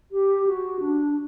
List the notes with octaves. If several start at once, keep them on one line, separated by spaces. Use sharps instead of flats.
G4
F#4
D4